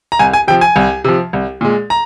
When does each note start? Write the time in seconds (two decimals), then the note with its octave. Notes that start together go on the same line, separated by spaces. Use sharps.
0.12 A#5
0.19 C2 G#5
0.33 G#5
0.48 C3 F3 G5
0.61 G#5
0.76 C2
1.04 C3 F3
1.33 C2
1.61 A#2 G#3
1.90 A#5